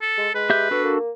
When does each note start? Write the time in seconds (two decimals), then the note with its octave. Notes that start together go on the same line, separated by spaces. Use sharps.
0.02 A4
0.17 G#3
0.35 G#3 B4
0.50 G4 E5 G6
0.71 B3 D4 F#4 A4
0.84 A#3